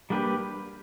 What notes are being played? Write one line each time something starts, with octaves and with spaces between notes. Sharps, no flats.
G3 A#3 D4 G4 B4